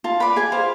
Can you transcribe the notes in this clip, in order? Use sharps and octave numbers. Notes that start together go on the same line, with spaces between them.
F4 A5
B4 D5 B5
G#4 G#5
C5 F5